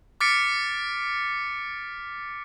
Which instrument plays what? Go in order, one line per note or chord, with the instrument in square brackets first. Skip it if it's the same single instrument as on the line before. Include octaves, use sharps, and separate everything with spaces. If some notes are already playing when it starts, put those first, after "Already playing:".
[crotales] D6 F6 A6 B6 C#7 D7